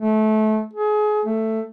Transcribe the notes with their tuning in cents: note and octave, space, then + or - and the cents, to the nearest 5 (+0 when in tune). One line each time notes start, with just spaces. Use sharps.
A3 -25
G#4 +30
A3 +10